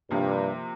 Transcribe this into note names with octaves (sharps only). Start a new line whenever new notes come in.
G2 C3 F3 A#3